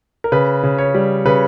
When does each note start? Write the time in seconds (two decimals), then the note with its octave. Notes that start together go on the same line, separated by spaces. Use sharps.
0.24 A#4
0.32 C#3 B4
0.63 C#3
0.78 C#5
0.94 G3
1.25 C#3 B4